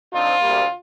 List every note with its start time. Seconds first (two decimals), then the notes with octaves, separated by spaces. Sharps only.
0.12 D3 F3 C4 D#4 F4
0.40 D2 C3 G3 A#3